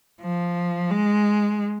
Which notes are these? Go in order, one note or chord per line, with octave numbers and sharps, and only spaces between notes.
F3
G#3